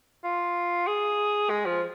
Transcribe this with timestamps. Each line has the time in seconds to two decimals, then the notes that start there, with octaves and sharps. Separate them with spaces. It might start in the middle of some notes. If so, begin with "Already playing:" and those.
0.24 F4
0.87 G#4
1.50 G#3
1.66 F3